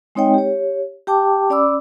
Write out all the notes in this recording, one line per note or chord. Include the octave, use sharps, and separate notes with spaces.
G#3 C4 D#4 C#5 D#5 G5
G4 C#5
G4 G5 A5 D6
C#4 D5 B5 D6 E6